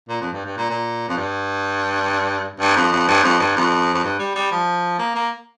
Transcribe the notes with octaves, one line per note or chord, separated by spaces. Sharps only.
A#2
F2
G2
G2
A#2
A#2
F2
G2
G2
F2
F2
G2
F2
G2
F2
F2
G2
G3
G3
F3
A#3
A#3